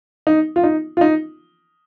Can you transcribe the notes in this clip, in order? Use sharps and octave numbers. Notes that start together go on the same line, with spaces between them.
D#4
F4
D#4
F4
D#4